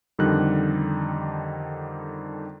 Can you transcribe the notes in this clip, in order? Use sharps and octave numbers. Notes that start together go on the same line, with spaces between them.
F2 D3 D#3 G3 D#4 F#6